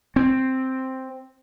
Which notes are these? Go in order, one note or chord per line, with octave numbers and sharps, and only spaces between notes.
C4